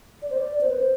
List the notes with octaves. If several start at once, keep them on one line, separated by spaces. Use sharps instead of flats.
D5
C5
D5
C5
B4
C5